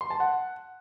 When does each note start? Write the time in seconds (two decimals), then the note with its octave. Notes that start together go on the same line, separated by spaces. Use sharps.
0.01 C6
0.10 A5
0.20 F#5